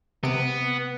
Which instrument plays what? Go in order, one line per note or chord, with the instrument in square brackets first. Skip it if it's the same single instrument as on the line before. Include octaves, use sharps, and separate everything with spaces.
[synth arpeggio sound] C3 D7 [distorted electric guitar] B3